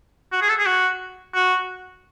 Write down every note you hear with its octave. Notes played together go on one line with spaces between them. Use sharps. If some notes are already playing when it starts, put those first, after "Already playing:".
F#4
G#4
A4
G#4
F#4
F#4